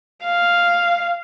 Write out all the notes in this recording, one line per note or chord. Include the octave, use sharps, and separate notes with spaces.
F5